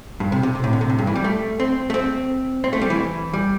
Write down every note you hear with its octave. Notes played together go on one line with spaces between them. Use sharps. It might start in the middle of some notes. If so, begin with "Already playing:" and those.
G2
C3
C3
C3
A2
D3
C3
A2
G2
E3
G3
A3
C4
A3
C4
C4
A3
G3
E3
G3